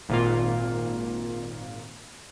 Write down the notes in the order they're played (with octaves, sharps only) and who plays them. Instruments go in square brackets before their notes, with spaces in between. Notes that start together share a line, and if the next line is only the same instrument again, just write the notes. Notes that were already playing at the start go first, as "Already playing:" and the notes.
[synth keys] G#1 A#2 F4